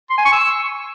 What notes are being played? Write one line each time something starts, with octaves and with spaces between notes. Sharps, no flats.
C6
G#5
C#6
E6